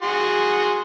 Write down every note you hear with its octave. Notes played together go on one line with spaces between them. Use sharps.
F#4 G#4 C6